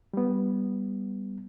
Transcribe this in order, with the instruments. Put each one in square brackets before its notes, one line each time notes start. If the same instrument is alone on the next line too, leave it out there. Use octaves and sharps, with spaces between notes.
[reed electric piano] G3 B3